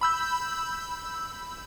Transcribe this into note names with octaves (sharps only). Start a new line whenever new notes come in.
B5 E6 G6